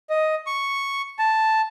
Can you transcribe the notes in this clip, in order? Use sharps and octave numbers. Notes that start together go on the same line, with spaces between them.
D#5
C#6
A5